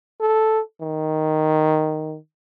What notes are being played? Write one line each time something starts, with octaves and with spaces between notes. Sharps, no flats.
A4
D#3